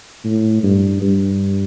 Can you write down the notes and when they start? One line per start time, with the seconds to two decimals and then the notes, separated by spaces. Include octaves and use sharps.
0.24 A2
0.63 G2
1.02 G2